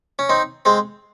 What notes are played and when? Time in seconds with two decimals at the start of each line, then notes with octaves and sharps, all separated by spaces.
0.19 C#4
0.29 C4 D#4
0.65 G#3 C4